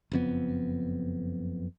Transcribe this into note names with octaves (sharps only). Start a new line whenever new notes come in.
F#1 F2 B3